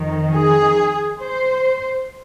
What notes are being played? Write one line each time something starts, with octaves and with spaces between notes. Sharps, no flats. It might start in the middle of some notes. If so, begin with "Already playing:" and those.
Already playing: F2 D#3
G#4
C5